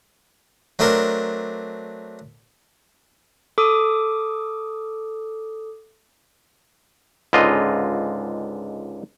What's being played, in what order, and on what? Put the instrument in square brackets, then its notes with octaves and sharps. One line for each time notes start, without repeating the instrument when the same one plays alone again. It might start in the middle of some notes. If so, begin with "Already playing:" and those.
[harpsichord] F#3 A3 C4 D4 A#4
[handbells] A4 D6 D#6
[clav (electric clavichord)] C#2 G#2 D3 F4 D#5